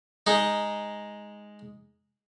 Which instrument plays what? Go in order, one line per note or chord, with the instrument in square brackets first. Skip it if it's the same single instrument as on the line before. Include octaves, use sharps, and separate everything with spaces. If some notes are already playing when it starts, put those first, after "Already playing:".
[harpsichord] G#3 D#4